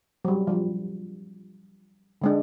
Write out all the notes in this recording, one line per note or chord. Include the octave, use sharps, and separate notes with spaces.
F#3 G3
F3 G3 F4
D3 G#3 D4